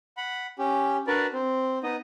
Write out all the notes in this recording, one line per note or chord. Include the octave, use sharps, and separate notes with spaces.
F#5 B5
C#4 G4
D4 F#4 A#4 B4 D5
C4
B3 D#4 D#5